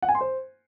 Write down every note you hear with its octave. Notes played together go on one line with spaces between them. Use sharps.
F#5
G#5
C6
C5